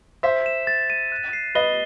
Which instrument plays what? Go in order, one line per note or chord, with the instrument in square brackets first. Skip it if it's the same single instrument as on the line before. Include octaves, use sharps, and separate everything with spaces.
[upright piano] C5 E5 [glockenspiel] B6
[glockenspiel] E7
A6
D#7
F#6
C7
[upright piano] B4 D#5 [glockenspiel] G7